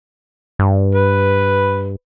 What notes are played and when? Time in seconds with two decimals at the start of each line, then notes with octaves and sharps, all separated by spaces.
0.59 G2
0.95 B4